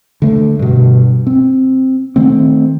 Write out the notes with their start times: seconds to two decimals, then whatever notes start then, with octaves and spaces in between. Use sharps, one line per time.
0.22 D3 A3
0.59 G2 B2
1.27 C4
2.16 D#3 A3 C4